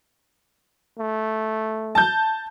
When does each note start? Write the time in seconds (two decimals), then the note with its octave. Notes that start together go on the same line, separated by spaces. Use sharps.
0.99 A3
1.95 A5 G6